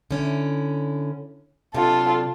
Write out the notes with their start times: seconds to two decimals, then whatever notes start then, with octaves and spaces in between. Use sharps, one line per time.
0.11 D3 C#4 E4
1.74 C3 F#3 D4 F4 A4